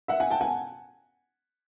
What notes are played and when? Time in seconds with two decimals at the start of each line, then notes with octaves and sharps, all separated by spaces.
0.08 E5 F#5
0.20 F#5 G#5
0.31 G5 A5
0.41 F#5 G#5